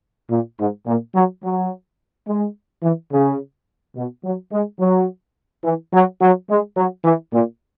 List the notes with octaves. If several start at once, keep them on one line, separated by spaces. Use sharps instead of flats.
A#2
G#2
A#2
F#3
F#3
G#3
E3
C#3
B2
F#3
G#3
F#3
E3
F#3
F#3
G#3
F#3
E3
A#2